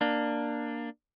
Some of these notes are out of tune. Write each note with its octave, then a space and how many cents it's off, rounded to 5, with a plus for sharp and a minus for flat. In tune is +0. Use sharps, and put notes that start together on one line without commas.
A#3 +0 D4 +10